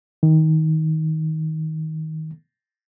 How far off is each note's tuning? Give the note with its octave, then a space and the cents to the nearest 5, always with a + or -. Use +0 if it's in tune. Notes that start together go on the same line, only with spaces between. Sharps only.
D#3 +20